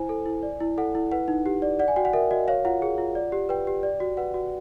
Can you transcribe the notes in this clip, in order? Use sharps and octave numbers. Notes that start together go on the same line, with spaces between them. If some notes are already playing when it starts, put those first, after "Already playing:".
Already playing: E4 C5 G#5
A4
E4
D5
E4
A4 F#5
E4
B4 F#5
D#4
G4
D5
D5 F#5
G#5
F#4 G5
F#5
A#4 E5
F#4 D#5
C#5 F5
F4 F#5
G#4
F4
D5
G4
B4 G5
G4
D5
F#4
B4 F#5
F#4